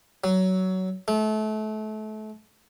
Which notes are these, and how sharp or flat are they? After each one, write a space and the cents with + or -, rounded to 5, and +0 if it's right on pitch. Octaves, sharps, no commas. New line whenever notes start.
F#3 +15
A3 -30